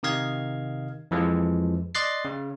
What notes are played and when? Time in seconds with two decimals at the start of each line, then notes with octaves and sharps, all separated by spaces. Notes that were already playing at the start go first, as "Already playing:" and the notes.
0.03 C3 D#3 D#5 F5 G#6
1.11 F2 E3 F3 G#3
1.95 D5 D#5 C6 F#6 A6 C7
2.25 C#3